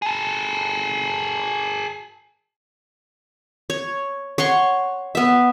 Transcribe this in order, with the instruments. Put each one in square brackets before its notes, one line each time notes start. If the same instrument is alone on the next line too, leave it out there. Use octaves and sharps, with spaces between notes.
[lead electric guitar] G#4 A4
[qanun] C#5
C#5 F#5 C6 C#6
B3 E5